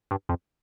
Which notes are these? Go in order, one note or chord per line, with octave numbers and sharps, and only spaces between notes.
G2
F2